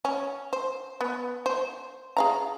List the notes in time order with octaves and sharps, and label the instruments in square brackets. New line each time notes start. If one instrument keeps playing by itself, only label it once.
[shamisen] C#4
C5
B3
C5
G#4 F5 A#5